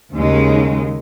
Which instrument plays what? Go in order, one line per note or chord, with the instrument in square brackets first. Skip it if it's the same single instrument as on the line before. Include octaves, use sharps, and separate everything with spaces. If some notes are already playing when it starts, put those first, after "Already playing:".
[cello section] D#2 C#3 G#3